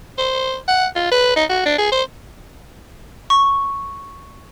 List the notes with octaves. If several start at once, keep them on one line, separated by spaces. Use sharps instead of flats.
C5
F#5
F4
B4
D#4
F#4
D4
G#4
C5
C#6